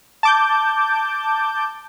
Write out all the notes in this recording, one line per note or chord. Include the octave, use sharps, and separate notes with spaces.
A5 D6 G6